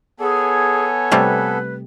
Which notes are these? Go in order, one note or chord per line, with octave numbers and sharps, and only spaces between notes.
B3 G#4 A4 C#5 G#5
C3 G3 A3 B4